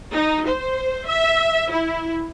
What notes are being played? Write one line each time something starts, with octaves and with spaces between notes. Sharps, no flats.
D#4
C5
E5
E4